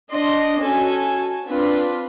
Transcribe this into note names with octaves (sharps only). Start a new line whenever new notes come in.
D4 D#5 C6
C#4 F#4 A4 G#5
C4 D4 F4 B4